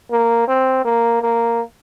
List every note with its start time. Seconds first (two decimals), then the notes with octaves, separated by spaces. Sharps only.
0.11 A#3
0.48 C4
0.85 A#3
1.22 A#3